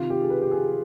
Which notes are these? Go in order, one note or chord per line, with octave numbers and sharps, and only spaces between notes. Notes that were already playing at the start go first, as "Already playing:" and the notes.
Already playing: C3 D#3 F4
G4
G#4
B4
G4
G#4